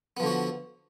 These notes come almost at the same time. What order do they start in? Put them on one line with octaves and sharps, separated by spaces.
B3 F3 D3 F#4